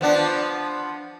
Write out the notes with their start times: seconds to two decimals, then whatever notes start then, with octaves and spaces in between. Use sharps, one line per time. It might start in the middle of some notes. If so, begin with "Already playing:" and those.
0.01 F3 B3 D4